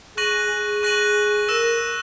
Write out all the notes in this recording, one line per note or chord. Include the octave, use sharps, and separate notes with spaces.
G#4 C#6 F#6 A#6 D#7 F#7
C#6 F#6 A#6 D#7 F#7
A#4 E6 A#6 E7